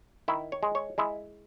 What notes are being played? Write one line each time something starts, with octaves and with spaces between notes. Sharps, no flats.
D#3 E4
C#5
G#3
C#5
G#3 E4